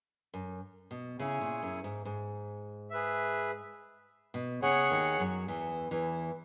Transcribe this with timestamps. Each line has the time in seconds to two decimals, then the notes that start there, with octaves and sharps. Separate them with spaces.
0.34 F#2
0.91 B2
1.19 C#3 C#4 E4 G#4 C#5 G#5
1.41 A#2
1.63 F#2
1.84 G#2
2.05 G#2
2.90 G#4 B4 E5
4.34 B2
4.62 C#3 G#4 C#5 F#5
4.91 D#2 D#3
5.20 F#2 F#3
5.48 E2 E3
5.91 E2 E3